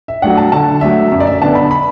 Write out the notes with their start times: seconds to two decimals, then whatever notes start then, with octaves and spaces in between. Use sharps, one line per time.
0.08 E5
0.22 F#3 A3 D4 F#5
0.37 A5
0.52 D3 A5
0.81 F#3 A3 D4 E5
1.12 F#2 E5
1.20 D5
1.27 E5
1.42 D3 B3 D4 A5
1.55 B5
1.71 B5